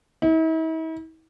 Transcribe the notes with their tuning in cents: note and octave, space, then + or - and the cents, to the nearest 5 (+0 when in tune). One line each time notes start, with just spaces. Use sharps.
E4 -45